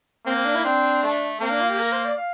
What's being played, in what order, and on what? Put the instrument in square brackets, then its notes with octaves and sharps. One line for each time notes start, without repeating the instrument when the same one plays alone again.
[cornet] A#3 [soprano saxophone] C4
[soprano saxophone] C4
D4
E4
[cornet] C4 [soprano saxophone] D4
[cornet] A3
[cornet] A#3 [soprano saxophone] C4
[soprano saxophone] D4
F4
G4
A#4
C5
D5
F5